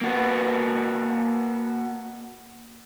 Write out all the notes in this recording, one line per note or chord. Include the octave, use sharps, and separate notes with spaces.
A#3 F#4 B4